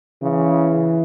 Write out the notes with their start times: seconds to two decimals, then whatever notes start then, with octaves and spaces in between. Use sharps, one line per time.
0.22 C#3 E3